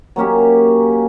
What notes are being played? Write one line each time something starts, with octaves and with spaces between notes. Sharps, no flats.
F#3 A#3 C#4 G4